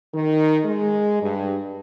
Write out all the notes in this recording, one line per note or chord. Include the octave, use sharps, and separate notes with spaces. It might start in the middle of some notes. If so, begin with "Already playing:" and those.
D#3
G#3
G2